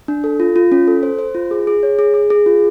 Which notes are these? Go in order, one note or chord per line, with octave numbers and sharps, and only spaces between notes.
D4
A4
F4
F4
C#4
A4
C5
C5
F4
G#4
G#4
C#5
G#4
G#4
G#4
F4